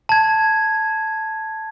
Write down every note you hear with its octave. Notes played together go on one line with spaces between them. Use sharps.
A5 G#6